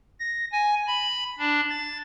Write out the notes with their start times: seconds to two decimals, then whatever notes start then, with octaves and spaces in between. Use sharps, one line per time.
0.20 A#6
0.52 G#5
0.87 B5
1.39 D4
1.69 A6